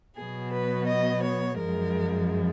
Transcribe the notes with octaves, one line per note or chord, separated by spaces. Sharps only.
B2 F#3 B3 G#4
B4
D#5
C#5
F#2 F3 G#3 A#4